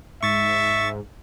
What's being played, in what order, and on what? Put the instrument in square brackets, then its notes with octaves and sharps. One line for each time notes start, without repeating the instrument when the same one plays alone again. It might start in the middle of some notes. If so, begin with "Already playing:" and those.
[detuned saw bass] G#2 [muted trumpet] E5 [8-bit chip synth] C#6 A6